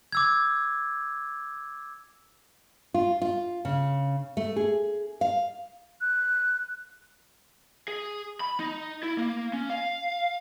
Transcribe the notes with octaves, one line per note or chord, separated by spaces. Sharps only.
D6 E6 G#6
F4
F4
C#3
A3
G#4
F5
F#6
G#4
B5
D#4
E4
A#3
C#4
F5